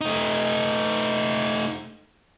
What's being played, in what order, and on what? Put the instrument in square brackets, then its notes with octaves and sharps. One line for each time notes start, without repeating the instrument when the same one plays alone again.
[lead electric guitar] A3 D#4